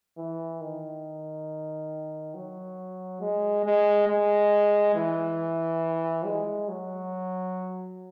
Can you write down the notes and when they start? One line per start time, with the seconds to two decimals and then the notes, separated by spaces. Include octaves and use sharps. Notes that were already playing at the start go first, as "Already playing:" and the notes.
0.18 E3
0.61 D#3
2.34 F#3
3.21 G#3
3.64 G#3
4.08 G#3
4.95 E3
6.25 G#3
6.68 F#3